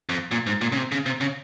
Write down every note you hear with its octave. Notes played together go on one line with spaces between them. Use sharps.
F2
A#2
G#2
A#2
C#3
C3
C#3
C3
C#3